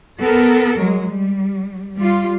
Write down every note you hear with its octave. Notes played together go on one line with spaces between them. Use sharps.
B3 A4 A#4
F#3 G#3
G3
G3 F4